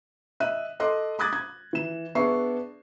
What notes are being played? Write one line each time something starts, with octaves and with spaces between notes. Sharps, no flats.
D#5 E5 F#6 D#7
A4 D#5 C6 D6 F#6
B5 D6 D#6 F#6 G#6 A6
G#6
E3 E7
B3 D4 G#4 E5 C#6 C7